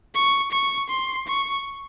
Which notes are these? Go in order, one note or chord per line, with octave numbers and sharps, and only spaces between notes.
C#6
C#6
C6
C#6